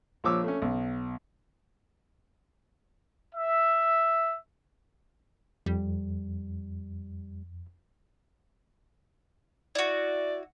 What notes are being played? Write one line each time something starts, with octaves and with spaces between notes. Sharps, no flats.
A#1 F3 C#5 D6 E6
A3 C#4
B1
E5
F2 G3
E4 F#4 D5